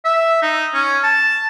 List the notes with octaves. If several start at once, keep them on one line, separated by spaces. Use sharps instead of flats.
E5
D#4
C#4
A5